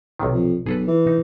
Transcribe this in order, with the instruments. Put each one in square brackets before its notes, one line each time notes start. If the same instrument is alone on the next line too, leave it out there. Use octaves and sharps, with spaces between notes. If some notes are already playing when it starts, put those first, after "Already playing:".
[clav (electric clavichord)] B1 C3 D#3
[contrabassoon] F2
[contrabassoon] B1 [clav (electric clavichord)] G#4 A4 B4
[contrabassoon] E3
[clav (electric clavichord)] D#4